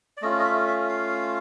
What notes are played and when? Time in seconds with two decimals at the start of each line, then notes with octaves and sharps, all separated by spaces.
0.17 D5
0.22 A3 C#4 F4 D#5
0.39 D#5
0.45 E5
0.67 E5
0.89 F5